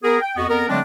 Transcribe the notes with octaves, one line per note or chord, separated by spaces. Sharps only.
B3 G#4 A#4
G5
F2 B3 F#4 D#5
F2 B3 A#4
D3 F#3 G#3 A3 C4 D4